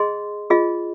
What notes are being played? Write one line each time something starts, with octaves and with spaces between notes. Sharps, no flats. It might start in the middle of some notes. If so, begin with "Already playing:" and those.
Already playing: G#4 D#5 C6
F4 G#4 D#5